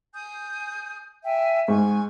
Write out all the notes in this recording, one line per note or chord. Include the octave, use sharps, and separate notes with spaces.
G#5 D#6 G6
E5 G5 G#5
G#2 G#5 C#6